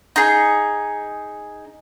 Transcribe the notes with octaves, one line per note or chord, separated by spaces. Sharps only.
D#4 G#4